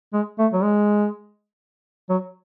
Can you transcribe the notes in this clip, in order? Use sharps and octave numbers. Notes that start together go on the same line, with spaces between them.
G#3
A3
F#3
G#3
F#3